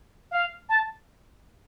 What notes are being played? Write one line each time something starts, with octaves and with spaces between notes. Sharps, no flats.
F5
A5